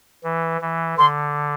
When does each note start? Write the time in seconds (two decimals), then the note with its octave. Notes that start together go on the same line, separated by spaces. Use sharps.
0.24 E3
0.61 E3
0.98 D3 C6